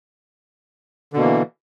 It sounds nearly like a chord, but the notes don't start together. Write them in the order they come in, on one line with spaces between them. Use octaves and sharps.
D3 B2 A#3 E3